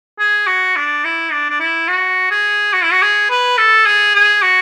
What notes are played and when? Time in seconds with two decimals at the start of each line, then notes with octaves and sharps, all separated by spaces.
0.20 G#4
0.47 F#4
0.76 D4
1.04 E4
1.32 D4
1.50 D4
1.60 E4
1.88 F#4
2.31 G#4
2.73 F#4
2.83 E4
2.92 F#4
3.02 G#4
3.30 B4
3.57 A4
3.86 G#4
4.15 G#4
4.42 F#4